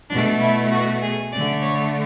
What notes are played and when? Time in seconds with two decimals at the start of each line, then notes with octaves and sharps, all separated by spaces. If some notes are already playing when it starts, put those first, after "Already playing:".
0.10 B2 A3 D4
0.40 E4
0.71 F#4
1.01 G#4
1.32 D3 A3 D5
1.62 C#5